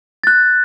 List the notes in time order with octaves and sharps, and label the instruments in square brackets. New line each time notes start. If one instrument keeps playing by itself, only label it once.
[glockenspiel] F#6 A6